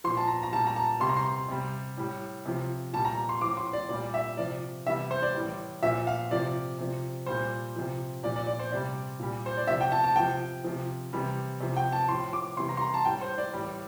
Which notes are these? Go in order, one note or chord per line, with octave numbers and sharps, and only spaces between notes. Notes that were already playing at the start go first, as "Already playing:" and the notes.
A#2 F3 C6
A5
A#5
A#5
A#2 G3 A5
A#5
A5
C3 G3 C6
A#5
C6
C3 G3
A2 G3
C3 F3
A#2 G3 A5
A#5
C6
A2 F3 D6
C6
D5
A#2 G3 D5
E5
C3 F3 D5
C3 E3 G3 E5
C5
D5
A2 E3 G3
A#2 F3 E5
F5
C3 F3 D5
C3 F3
A#2 G3 C5
C3 F3
A#2 F3 D5
D5
D5
C5
C3 G3 D5
A#2 G3
C5
D5
C3 F3 E5
G5
A5
A5
C3 F3 G5
C3 F3
C3 E3 G3
C3 F3
G5
A5
A2 F3 C6
D6
C3 E3 G3 C6
A#5
C6
A#5
A5
A2 G3 G5
C5
D5
A2 E3 G3